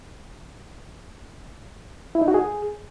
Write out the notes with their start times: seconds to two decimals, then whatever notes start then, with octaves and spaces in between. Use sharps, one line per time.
2.15 E4
2.21 D#4
2.28 F#4
2.34 G#4